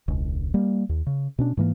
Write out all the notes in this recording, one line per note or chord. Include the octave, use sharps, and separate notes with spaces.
E1 C#2
G3 A#3
D#2
C#3
B2 C#4 D4
G#2 E3 A#3